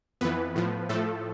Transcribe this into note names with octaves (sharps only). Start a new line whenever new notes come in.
F2 E3 B3 B4
A2 F3
A2 F3 A3 A4